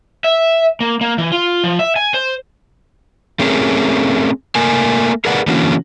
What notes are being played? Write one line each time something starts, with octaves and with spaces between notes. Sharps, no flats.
E5
A#3
A#3
E3
F4
F3
E5
G#5
C5
A3 C4 C#4 G#4 A#4
A3 A#3 A#4 G#5
G#4 A#4 B4 D5 F#5
D3 E3 A#3 C#4 F#4